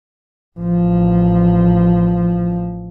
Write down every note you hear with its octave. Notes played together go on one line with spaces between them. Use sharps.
A1 F3